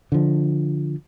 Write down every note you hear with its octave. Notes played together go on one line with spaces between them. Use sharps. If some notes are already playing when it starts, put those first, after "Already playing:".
D3 F3